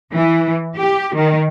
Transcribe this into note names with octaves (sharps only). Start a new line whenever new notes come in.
E3
G4
D#3